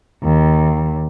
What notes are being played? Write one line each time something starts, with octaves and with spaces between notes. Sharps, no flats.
D#2